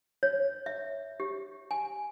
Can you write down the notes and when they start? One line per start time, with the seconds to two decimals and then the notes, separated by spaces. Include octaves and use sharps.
0.23 C#5
0.66 E5
1.20 G4
1.71 G#5